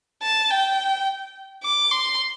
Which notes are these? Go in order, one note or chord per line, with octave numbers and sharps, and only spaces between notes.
A5
G5
D6
C6